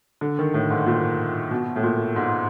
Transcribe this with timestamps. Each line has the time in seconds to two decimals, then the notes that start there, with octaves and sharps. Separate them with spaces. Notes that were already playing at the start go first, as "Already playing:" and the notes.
0.21 D3
0.39 D#3
0.54 A2
0.70 G#2
0.86 A#2
1.51 B2
1.76 A2
1.83 A#2
2.16 G#2